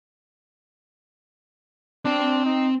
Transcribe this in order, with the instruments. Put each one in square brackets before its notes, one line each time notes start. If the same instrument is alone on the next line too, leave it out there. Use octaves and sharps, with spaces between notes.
[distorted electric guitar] C4 G5 [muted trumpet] D4
[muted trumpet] D#4